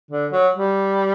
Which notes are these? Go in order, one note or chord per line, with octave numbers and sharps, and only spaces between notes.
D3
F#3
G3